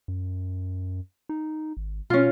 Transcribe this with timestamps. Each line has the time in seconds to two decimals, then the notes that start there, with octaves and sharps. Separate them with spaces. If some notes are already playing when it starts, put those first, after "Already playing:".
0.08 F#2
1.29 D#4
1.77 G#1
2.10 B2 C#4 F4